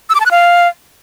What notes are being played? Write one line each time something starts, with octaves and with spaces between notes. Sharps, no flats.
E6
D6
A5
F#6
F5